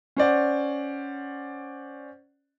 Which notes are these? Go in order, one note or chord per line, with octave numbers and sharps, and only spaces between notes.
C#4 C5 D5 F#5